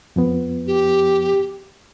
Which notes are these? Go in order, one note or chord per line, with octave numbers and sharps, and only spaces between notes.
F2 F3 B3
G4